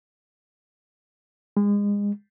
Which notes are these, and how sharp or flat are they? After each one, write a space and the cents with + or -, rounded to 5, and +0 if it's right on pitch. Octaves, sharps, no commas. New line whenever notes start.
G#3 -30